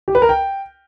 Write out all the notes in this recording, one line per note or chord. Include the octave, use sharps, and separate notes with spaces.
G4
B4
A#4
G5